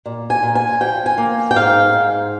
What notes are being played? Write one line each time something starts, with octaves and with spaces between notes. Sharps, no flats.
A#2
G#5
A#2
G#5
F3 G5
G#5
A#3
G5
G#2 F5
G#2